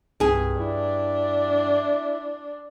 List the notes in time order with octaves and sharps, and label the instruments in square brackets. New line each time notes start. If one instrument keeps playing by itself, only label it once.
[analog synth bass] C2 [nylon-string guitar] G2 G#4
[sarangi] D4 [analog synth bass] E4